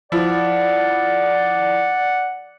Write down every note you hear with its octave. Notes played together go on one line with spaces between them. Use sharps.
F3 E4 D5 F#5